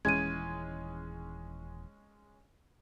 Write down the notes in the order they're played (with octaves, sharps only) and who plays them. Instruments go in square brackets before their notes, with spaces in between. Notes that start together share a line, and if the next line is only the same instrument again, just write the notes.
[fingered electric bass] D#1 E3 [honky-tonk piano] G#3 C#4 [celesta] G#6 D#7